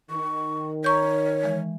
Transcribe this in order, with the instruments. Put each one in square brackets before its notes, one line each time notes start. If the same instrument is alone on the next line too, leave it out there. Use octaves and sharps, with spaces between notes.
[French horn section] D#3 [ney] C#6
[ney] C#5 [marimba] A#5 C#6 G6
[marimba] E3 G#3